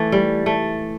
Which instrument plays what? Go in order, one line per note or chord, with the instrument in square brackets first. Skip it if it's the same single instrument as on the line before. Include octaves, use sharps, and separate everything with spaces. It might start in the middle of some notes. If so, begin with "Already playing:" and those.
Already playing: [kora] E3 A3
G3
A3